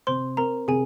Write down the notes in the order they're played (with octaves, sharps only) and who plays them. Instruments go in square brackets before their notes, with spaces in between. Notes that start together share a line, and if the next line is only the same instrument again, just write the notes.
[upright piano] C3 [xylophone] C5 C6
[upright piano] C4 [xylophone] A#4 A#5
[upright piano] C3 [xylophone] G#4 G#5